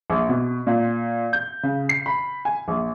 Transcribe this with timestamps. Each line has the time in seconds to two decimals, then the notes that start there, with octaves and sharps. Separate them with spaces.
0.10 A#1
0.29 B2
0.67 A#2
1.33 G6
1.63 C#3
1.89 C7
2.06 B5
2.45 G#5
2.68 A#1